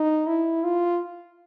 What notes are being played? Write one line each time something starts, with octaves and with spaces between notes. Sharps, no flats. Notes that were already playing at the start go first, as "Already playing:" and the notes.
Already playing: D#4
E4
F4